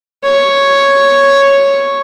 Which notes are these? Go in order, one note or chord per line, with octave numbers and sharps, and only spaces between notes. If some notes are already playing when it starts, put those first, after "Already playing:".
C#5